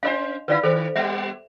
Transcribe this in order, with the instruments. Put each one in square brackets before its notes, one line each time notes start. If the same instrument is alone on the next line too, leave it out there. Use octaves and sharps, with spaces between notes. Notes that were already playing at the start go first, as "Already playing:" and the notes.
[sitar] C#4 A#4 C5 [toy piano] D4 D#5 F5
[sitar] D3 C#4 E4 [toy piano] B4 D5 F5
[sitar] D#3 [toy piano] A4 C5
[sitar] G3 B3 G4 [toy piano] E5